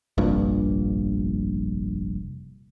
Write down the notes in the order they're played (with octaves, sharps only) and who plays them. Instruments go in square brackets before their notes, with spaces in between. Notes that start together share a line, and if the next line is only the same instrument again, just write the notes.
[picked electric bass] F1 A#1 G2 A#2